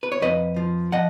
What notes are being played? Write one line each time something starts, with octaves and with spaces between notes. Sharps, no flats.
B4
C#5
F2 B4 D#5
F3
F3 D#5 F#5